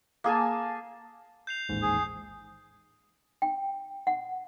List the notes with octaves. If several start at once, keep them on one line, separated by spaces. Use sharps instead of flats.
A#3 G#4 G#5 A5
G6 C7 F7
A1 D#2 G#2
G#4
G5
F#5